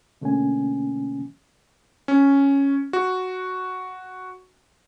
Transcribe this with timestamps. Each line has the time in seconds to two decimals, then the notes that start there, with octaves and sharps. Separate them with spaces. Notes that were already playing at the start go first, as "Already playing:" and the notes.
0.21 B2 D3 A3 A#3 C#4 G#5
2.08 C#4
2.93 F#4